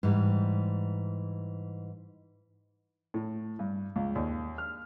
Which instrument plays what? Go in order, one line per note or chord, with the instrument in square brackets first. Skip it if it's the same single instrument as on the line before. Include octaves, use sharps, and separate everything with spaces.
[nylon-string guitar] G#2 E3 G3
[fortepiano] A2
G2
C#2
D#2
F6